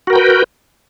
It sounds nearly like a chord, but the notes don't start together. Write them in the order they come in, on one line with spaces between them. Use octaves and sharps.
F#4 A#4 G5 B4